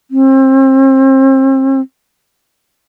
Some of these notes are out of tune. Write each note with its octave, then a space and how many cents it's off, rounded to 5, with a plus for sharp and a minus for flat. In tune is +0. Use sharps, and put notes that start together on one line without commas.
C4 +35